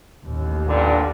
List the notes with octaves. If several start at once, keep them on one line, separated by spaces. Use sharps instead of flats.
A1 D#2
G2 A#2 D3